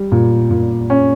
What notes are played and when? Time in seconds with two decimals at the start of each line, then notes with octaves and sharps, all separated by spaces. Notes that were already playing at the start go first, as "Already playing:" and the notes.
Already playing: G3
0.12 A#2
0.51 A#2
0.90 C#4